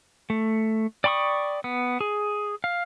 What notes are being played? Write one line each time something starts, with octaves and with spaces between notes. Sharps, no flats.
A3
D5 G5 B5 C#6 D#6
B3
G#4
F5